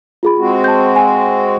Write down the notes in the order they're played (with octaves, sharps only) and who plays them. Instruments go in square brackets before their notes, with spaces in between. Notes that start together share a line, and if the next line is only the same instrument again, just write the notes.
[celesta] F4 G#4 B5
[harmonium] G#3 C4 F#4
[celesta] A5 G6
G#5